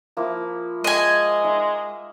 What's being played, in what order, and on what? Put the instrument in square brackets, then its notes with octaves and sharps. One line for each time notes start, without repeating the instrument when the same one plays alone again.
[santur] F3 A#3 E4
[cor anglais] G#3 [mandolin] D#5 G#5
[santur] D#4 E5